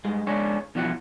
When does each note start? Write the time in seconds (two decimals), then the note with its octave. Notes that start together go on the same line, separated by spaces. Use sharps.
0.05 G2 G#3
0.27 C#2 G#2 D4 G#4 C#5
0.75 B2 E3 F3 F#4 D#5 F#5